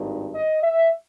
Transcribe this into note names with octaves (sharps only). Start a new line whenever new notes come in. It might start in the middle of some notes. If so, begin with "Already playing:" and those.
Already playing: G#1 G2 D#3
D#5
E5